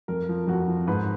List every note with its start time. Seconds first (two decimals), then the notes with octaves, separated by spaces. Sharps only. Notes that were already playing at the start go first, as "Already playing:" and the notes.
0.08 F2 A#4
0.29 F3
0.47 F2 F#4
0.68 F3
0.87 G#2 B4